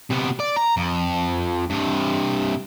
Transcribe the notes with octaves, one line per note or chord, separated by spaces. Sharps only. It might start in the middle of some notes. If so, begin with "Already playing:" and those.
C3 B3
D5
A#5
F2
G2 C3